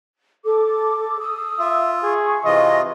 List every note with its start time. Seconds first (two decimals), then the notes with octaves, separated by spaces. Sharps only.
0.45 A4 D6
1.19 D#6 E6
1.59 F4 E5
2.03 G#4 C#6
2.45 C3 E3 F4 D#5